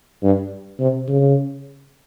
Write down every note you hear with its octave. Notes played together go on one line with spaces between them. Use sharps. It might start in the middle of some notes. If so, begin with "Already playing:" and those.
G2
C3
C#3